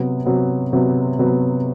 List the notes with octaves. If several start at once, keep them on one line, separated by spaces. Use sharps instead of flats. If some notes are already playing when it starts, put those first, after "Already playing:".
Already playing: C3 F#3 B3
C3 F#3 B3
C3 F#3 B3
C3 F#3 B3